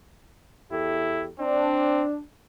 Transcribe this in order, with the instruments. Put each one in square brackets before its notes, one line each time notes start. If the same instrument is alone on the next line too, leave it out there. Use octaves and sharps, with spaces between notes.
[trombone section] E2 G4 A4 [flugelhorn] E4
[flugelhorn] C4 [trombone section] D4